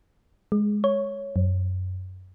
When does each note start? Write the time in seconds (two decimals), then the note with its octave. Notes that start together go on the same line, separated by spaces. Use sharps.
0.52 G#3
0.84 C#5
1.36 F#2